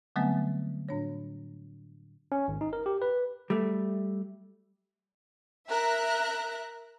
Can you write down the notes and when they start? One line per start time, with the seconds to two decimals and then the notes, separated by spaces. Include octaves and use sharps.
0.16 D3 F#3 G3 A3 B3 C4
0.89 A2 D4 C#5
2.32 C#4
2.48 G#1
2.61 D#4
2.73 A#4
2.86 G4
3.02 B4
3.50 G3 A3
5.69 A#4 E5 A#5 F#6